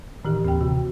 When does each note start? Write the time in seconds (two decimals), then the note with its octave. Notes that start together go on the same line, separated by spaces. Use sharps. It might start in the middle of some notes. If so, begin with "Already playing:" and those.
0.25 A2 D#3 E3 G4
0.45 D#2 C4 G5
0.61 C3 F#4